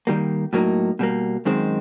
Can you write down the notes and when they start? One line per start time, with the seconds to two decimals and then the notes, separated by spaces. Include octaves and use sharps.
0.07 D#3 G3 A#3
0.53 A2 F#3 A#3 D#4
0.99 B2 G3 A#3
1.45 F#2 D#3 G#3 C4